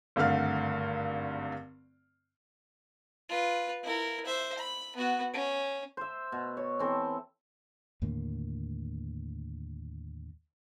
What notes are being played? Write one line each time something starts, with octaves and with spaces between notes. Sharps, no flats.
G#1 G2 D3 A3 F5 F6
F4 B4
E4 A#4
C5 E5
B5
B3 F#4
C#4
C5 E5
B2
C#5
E3 C4 A4
D#2 A2 D3 A#3